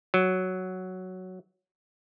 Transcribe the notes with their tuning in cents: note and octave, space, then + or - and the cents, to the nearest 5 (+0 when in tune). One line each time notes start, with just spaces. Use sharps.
F#3 +5